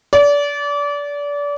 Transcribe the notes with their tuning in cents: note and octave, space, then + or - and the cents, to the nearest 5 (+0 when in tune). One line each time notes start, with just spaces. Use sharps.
D5 -30